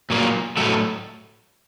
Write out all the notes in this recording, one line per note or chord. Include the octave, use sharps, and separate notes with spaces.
A#2 F#3 A#3
A2 F#3 A3